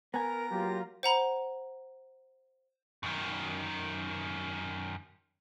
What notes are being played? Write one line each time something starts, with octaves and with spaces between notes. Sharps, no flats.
B3 A#4 G#5 A#5
F#3 A#3 F4 G4
C5 F#5 A#5 B5
F#2 D#3